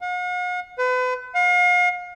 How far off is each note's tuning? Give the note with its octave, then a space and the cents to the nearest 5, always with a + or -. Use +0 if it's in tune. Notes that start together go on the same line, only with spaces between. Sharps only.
F#5 -45
B4 +35
F5 +40